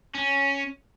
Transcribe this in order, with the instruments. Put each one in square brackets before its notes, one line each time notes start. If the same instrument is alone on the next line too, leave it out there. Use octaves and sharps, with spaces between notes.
[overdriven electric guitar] C#4